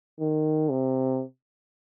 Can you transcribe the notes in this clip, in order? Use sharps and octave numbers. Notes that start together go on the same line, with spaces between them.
D#3
C3